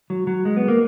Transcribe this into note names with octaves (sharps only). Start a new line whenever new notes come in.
F#3
F#3
G#3
B3
A#3